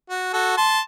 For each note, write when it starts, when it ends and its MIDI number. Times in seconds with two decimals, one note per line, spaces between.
0.10 0.30 66
0.33 0.54 66
0.33 0.54 69
0.57 0.80 81
0.57 0.80 84